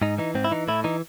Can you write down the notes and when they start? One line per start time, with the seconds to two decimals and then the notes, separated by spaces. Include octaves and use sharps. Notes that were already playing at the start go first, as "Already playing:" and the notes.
0.02 G#2 D#4
0.18 E3 D#4
0.35 G#2 C4
0.44 E4
0.51 E3 D#4
0.68 A2 E4
0.84 E3 D#4